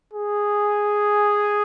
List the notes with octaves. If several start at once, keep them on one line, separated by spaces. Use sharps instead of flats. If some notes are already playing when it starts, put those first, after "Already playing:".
G#4